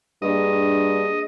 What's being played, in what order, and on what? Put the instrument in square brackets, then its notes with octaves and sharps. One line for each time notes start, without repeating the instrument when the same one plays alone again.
[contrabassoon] G2 [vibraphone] A#3 D4 G#4 [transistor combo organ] D#5